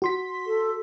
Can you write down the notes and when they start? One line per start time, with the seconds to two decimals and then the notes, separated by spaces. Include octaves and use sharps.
0.02 F#4 C6 B6
0.47 A4